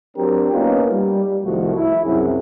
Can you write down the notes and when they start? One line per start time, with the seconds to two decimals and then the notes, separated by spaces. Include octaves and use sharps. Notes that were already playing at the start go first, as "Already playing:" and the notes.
0.17 F#3 C4 D4 G4 A#4
0.52 A#3 B3 C#4 D#4 F4
0.91 G3
1.44 C2 D#3 F3 A3 F#4
1.75 E4
2.05 C2 F#2 F#3 C4 G#4